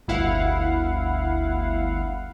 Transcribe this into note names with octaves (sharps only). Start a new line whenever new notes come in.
G1 D2 E4 F5 F#5